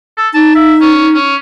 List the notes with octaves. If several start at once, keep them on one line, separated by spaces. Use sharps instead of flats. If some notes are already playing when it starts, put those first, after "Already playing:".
A4
D#4 A5
E5
C#4
C#4